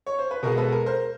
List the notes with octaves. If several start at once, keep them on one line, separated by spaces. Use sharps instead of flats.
C#5
C5
B4
B2 G#3 B3 A#4
A4 B4
A#4
A#4 C5